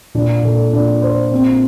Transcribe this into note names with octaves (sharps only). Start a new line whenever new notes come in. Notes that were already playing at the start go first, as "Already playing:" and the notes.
A#2 D4
A#2 A4
A#2 D4
C5
C4